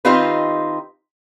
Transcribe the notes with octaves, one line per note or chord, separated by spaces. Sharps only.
D#3 C4 D#4 F4 G4 B4